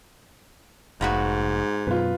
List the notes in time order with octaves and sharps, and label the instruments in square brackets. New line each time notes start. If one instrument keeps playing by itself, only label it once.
[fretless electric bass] F1 [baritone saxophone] G#2 [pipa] A#3 B3 F#4
[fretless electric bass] F#2 B2 [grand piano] F4 B4